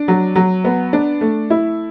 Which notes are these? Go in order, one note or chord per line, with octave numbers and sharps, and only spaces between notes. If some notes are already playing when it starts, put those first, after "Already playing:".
Already playing: D4
F#3
F#3
B3
D4
A3
E4